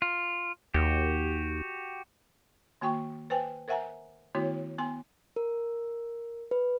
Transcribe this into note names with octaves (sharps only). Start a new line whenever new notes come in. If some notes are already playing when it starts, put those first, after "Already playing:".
F4
D#2 F#4 G4
D#3 A#3 F#4 G5 C#6
B4 C5 G5 G#5
A#4 C5 E5 F#5 G#5 A#5
D#3 A3 B3 E4 F#4 C#5
B3 G#5 C6
A#4
B4